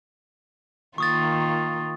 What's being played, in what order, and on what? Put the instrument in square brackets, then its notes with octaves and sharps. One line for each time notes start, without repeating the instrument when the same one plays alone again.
[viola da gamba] D#3 A#3 F4 [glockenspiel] C#6 D#6 A6